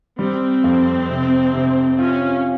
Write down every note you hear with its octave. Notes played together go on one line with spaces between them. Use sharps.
G3 C4
F2
C3
C3
C#4 F4